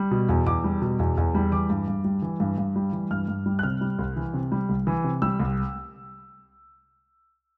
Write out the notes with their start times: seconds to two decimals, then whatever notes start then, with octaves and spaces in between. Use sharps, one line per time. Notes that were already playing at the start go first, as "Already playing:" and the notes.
Already playing: G3
0.11 B2
0.29 E2
0.46 E2 D6
0.64 G3
0.82 B2
0.99 E2
1.17 E2
1.35 G3
1.52 E3 D6
1.70 G2
1.88 G2
2.04 G3
2.22 E3
2.40 G2
2.58 G2
2.76 G3
2.93 E3
3.11 G2 F6
3.28 G2
3.46 G3
3.59 F#6
3.63 C3 F6
3.81 G3
3.99 C2
4.16 E3
4.34 C3
4.52 G3
4.69 C2
4.87 E3
5.04 C3
5.22 G3 E6
5.40 C2